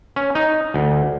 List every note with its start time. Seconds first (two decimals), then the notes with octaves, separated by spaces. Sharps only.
0.16 C#4
0.35 D#4
0.74 D2